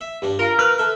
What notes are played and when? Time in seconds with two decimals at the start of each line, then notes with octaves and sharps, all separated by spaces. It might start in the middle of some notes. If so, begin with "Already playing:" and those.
0.01 E5
0.22 G2 D4
0.39 F4 A#4
0.59 B4 F6 F#6
0.78 A4 E5